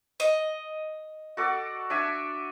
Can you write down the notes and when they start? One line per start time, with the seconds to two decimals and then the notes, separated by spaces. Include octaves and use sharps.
0.20 D#5
1.37 F#4 A4 D5
1.90 D4 E5 G#5